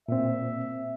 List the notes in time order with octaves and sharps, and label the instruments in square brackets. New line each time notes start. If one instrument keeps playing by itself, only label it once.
[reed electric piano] A#2 C4 [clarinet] E5